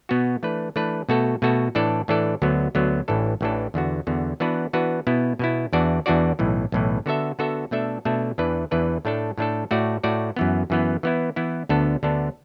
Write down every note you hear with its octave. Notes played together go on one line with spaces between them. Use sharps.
B2 B3 F#4
E3 A3 D4 B4
E3 A3 D4 B4
B2 A3 F#4 A4
B2 A3 F#4 A4
A2 E3 D4 A4 D5
A2 E3 D4 A4 D5
D2 D3 F#3 B3
D2 D3 F#3 B3
A1 A2 E3 D4 A4
A1 A2 E3 D4 A4
E2 D3 B3 F#4
E2 D3 B3 F#4
E3 B3 D4 F#4 B4
E3 B3 D4 F#4 B4
B2 B3 E4
B2 B3 E4
E2 E3 D4 F#4 D5
E2 E3 D4 F#4 D5
B1 A2 E3
B1 A2 E3
D3 B3 F#4 A4 E5
D3 B3 F#4 A4 E5
B2 A3 D4 A4 E5
B2 A3 D4 A4 E5
E2 E3 D4 B4
E2 E3 D4 B4
A2 A3 D4 A4
A2 A3 D4 A4
A2 A3 F#4 D5
A2 A3 F#4 D5
F#2 E3 B3
F#2 E3 B3
E3 B3 E4
E3 B3 E4
D2 D3 B3 D4 A4
D2 D3 B3 D4 A4